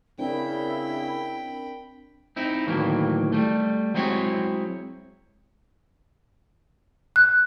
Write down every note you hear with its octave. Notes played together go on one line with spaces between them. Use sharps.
C#3 C4 D4 E4 A#4 G5 B5
C4 D#4 E4
D2 A2 D#3 E3 F#3 A#3
G3 A3
F#3 G#3 C4 E4 C#5
F#6